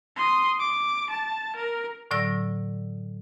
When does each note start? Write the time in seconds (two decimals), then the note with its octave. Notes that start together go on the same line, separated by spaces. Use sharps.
0.16 C6 D#6
0.60 D6
1.10 A5
1.56 A#4
2.11 A2 D3 F#3 D5 E6 A#6